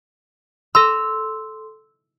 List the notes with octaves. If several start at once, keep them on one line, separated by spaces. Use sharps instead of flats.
A4 C6 E6